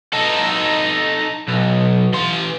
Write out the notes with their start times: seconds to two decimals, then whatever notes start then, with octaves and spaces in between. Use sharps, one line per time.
0.13 D#4 A4
1.48 B1
2.13 E3 C6